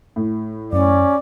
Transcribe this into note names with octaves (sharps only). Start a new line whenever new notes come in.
A2
F#2 C#4 D5